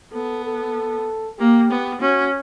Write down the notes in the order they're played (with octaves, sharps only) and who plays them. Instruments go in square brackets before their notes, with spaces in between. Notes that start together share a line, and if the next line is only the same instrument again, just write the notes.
[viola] B3 [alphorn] A4
[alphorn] A4
[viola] A#3 [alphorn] G4
[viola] B3
[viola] C#4 [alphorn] F#4